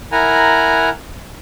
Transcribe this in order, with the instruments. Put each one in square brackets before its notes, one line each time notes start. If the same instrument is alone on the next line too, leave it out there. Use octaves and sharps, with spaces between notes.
[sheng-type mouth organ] E4 A#4 F#5 G#5 A#5